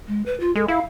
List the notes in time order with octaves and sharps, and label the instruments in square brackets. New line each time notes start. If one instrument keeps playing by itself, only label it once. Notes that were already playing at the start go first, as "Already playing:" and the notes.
[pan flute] G#3
B4
F4
[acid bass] G#3 [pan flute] A4
[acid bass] E4 [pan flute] F5